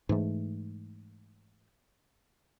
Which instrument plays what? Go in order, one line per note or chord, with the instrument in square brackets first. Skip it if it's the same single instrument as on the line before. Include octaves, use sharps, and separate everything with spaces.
[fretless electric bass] G#2 E3 A3